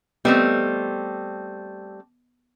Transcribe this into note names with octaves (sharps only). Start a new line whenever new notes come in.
G3 A3 B3 C4 D#5